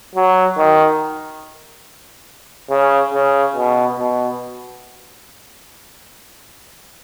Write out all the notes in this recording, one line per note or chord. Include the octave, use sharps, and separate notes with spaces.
F#3
D#3
C#3
C#3
B2
B2